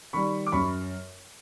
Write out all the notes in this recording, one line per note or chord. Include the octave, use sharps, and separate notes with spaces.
D#3 G3 B5 C#6
D6
F#2 B5 C#6